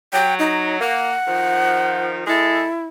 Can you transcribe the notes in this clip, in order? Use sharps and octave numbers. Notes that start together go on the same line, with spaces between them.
F#3 G5
D#4
A#3 F#5
D#3 F3
G#3 E4 G#4 A4